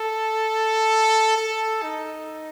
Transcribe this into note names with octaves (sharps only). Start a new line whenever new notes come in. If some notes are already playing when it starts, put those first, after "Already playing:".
Already playing: A4
A4
D#4